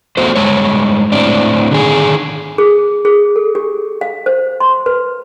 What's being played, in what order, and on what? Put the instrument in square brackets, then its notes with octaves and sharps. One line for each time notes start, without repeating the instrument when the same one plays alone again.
[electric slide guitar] A3 B3 F#4 C5
G2 G#3 C#5
A2 C4 D4
D3 D#3 G#4
[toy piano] G#4
G#4
A4
G4
F5
C5
C6
B4